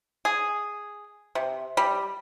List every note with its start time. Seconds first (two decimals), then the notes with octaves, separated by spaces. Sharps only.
0.25 G#4
1.35 C3
1.77 G3